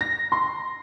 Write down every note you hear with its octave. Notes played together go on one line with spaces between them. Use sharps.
A#6
C6